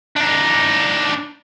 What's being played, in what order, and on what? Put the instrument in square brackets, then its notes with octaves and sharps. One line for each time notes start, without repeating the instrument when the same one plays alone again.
[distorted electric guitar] D4 D#4